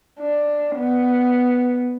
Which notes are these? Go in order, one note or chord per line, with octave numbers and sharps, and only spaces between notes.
D4
B3